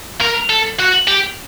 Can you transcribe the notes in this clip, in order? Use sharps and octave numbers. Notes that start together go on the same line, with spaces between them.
A#4
A4
F#4
G4